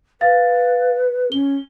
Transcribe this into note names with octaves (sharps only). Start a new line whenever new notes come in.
B4 F5 A6
C#4 G7